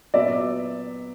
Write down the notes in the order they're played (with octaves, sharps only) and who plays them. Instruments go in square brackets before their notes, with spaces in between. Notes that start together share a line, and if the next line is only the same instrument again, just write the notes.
[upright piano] A#2 F#3 B3 D5 E5